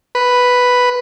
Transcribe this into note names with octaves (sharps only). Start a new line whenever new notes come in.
B4